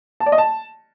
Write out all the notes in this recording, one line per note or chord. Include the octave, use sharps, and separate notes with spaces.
A5
D5
D#5
A5